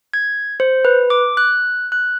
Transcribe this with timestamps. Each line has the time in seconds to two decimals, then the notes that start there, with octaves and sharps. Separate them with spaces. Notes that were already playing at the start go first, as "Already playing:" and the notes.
0.14 G#6
0.60 C5
0.85 B4
1.10 D6
1.37 F#6
1.92 F#6